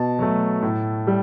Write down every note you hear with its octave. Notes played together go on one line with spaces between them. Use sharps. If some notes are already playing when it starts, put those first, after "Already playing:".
Already playing: B2 A5
F#3 A3
A2
G3